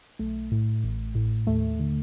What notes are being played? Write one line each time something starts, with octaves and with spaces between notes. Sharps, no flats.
B1 A3
A2
A1
A2
D#2 A3
D3